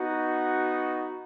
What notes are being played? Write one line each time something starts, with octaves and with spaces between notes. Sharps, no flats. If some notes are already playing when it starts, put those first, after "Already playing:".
Already playing: B3 D#4 F#4